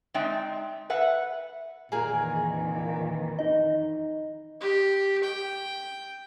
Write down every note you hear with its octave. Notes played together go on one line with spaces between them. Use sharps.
G#3 C4 D#4 D5 E5 G5
B4 E5 F#5
F2 A#2 D#3 E3 G#4 A#4 G#5
D#4 D#5
G4
G5